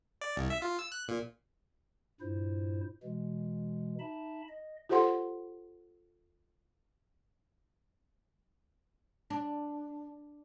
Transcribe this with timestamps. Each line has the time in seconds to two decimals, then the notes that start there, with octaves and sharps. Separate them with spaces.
0.21 D5
0.37 C2
0.50 E5
0.62 F4
0.79 E6
0.92 F#6
1.08 A#2
2.21 G2 A#2 E4 C5
3.03 B2 E3 G#3
3.99 D#4 E5 A5 B5
4.49 D#5
4.89 F4 G4 A4 C5 F#5 C6
9.30 D4